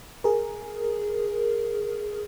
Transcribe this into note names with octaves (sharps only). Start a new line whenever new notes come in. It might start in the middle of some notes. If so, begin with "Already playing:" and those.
G#4 A#4